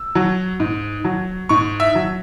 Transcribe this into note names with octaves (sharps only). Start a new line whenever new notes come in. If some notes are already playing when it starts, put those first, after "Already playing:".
Already playing: E6
F#3
G#2
F#3
G#2 C#6
E5
F#3